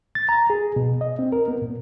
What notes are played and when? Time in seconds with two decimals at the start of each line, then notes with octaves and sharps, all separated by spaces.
0.15 A6
0.29 A#5
0.50 G#4
0.76 B2
1.01 D#5
1.19 C4
1.32 A#4
1.48 B3
1.62 A#2